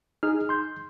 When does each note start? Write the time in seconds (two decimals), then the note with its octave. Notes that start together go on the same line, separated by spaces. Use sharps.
0.23 D#4 G#4 F6
0.49 C6 G6